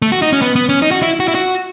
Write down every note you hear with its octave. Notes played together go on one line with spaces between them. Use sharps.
A3
F#4
D#4
C#4
B3
B3
C#4
D#4
F#4
E4
F#4
E4
F#4